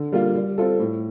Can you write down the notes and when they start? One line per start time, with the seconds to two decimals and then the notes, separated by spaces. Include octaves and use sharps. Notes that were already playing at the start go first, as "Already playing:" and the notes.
Already playing: D3
0.12 G3 A#3 F4
0.35 G3
0.58 C4 F4 A4
0.79 A2